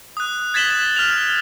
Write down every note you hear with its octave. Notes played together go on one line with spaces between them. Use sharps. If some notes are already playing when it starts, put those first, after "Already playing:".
D#6 F#6
G#6 A6 B6 E7 F#7 G7
F6 F7